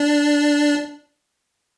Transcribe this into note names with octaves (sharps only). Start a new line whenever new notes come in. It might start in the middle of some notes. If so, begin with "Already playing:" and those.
Already playing: D4